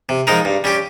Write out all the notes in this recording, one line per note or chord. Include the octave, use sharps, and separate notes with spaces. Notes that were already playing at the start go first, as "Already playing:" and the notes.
C3
F3 G#3 D#4 A#4
G2
G3 C#4 G4